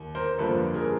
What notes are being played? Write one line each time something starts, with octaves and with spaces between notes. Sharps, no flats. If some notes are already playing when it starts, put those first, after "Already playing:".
Already playing: D#2
A#4 C5
G1 F2 D3 F3 A#3 A4 B4
G#4 A#4